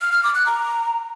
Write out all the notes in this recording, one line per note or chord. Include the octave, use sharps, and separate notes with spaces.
F6
F6
D6
F#6
A#5